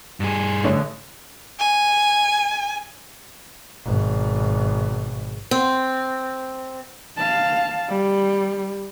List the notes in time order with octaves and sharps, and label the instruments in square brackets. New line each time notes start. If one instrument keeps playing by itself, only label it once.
[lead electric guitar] G2 G#4
[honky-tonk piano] A1 D3 C#5
[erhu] G#5
[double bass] G#1 B2
[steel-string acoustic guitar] C4
[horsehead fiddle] F5 A5
G3